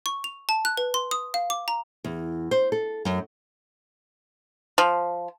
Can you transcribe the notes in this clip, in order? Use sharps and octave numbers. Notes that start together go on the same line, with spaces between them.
C#6
F7
A5
F#6
B4
C6
D#6
F5
D6
A#5
E2
C5
A4
F#2
F3